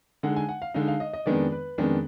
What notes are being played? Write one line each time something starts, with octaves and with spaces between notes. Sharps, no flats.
D3 G#3 D#4 F#5
G#5
F#5
F5
D3 G#3 D#4 F5
F5
D#5
D#5
F2 D#3 G#3 B3 D4 D5
B4
F2 D#3 G#3 B3 D4